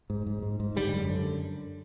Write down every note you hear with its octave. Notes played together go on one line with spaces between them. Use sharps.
G#2
G#2
G#2
G#2
D3 G3
F#2
D3